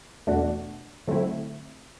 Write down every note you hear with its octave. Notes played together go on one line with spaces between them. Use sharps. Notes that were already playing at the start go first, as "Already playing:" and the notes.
E2 B2 A3 D4 F#4
D3 F#3 A3 C4 E4